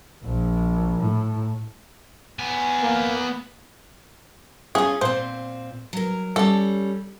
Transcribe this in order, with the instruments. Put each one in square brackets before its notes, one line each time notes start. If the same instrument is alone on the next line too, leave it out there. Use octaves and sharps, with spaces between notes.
[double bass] A#1
A2
[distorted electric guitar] B3 G#5
[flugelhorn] A#3
[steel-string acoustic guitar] C#4 F4 [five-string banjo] G#4
[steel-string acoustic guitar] A#2 C4 [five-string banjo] C5
[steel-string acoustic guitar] F#3 A#4
[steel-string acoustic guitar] G3 C#4 [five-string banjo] A4